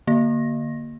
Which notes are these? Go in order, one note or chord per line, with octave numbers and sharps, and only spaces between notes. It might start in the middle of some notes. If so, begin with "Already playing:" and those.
D3 A#3 A#6